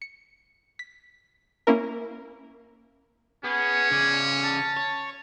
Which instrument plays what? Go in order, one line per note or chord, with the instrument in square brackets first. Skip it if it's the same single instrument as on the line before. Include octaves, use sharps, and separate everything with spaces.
[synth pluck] C#7
B6
A#3 C#4 E4 A#4
[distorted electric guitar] B3 [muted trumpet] C#4 [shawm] G#4
[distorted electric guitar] C#3 D5
[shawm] A5
[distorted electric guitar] C#5